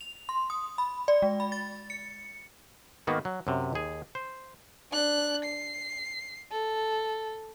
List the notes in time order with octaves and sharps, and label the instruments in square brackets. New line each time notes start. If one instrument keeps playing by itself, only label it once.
[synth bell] F7
C6
D#6
B5
D5
G#3
B5
A6
C#7
[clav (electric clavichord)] G#2 D#3 A#3 B3 F#4
F#3
F#2 C3
D#2 G#4
C5
[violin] D4 F#6
C7
A4